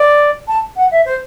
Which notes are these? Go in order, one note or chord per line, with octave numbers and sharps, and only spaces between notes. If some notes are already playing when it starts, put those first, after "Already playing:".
Already playing: D5
A5
F#5
E5
C5